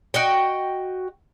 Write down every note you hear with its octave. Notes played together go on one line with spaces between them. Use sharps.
F#4 D#5 G5